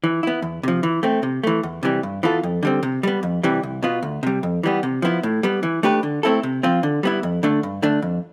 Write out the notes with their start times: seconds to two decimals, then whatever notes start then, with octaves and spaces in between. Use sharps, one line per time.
0.04 E3
0.23 B3 E4
0.42 E2
0.63 C3 F3
0.83 E3
1.03 A3 C4
1.23 C3
1.43 E3 A3
1.63 E2
1.83 C3 E3 G3
2.03 G2
2.23 E3 B3 F4 A4
2.43 F2
2.63 D3 G3 C4
2.83 C3
3.03 G3 B3
3.23 F2
3.43 C3 E3 G3
3.63 C2
3.83 B2 B3 F4
4.03 D2
4.23 C3 G3
4.43 F2
4.63 E3 G3 B3
4.83 C3
5.02 F3 B3 E4
5.23 A2
5.43 G3 B3
5.63 E3
5.83 A3 D4 G4 B4
6.03 D3
6.23 A3 C4 E4 A4
6.43 C3
6.63 F3 C4 F4
6.83 D3
7.03 G3 B3 E4
7.23 F2
7.43 D3 A3 D4
7.63 G2
7.82 D3 A3 D4
8.02 F2